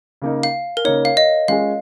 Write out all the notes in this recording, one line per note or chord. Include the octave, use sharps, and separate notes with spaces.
C#3 A#3 D#4
F5
A#4
C#3 A#3 D#4 C#5
F5
D#5
G#3 C#4 F4 G#4 F5